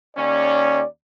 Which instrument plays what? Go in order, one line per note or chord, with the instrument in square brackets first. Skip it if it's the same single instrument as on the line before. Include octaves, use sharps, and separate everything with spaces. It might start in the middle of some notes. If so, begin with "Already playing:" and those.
[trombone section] D#2 C#4 [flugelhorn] D5